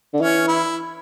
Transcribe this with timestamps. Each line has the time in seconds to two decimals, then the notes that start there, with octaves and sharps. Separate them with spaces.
0.13 D3
0.21 E3 C#4
0.48 E4